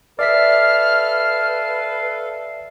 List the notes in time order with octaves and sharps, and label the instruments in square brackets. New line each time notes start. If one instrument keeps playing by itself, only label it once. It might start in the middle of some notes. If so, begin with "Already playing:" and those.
[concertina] A4 F5 [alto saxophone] B4 [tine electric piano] D5 E5 B6 [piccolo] F6